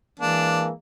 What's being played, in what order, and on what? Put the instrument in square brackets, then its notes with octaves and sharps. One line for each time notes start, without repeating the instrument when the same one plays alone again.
[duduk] E3 [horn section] G#3 A#3 [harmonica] D4